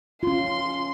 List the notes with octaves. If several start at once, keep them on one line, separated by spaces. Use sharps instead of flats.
C#4 F4 C6